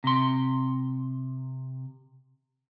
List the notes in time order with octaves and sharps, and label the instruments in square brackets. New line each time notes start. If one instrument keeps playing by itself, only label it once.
[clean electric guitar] C3 C6